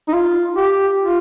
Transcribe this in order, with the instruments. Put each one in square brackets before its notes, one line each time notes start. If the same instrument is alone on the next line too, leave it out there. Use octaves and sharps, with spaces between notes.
[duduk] D#4
F4
G4
F4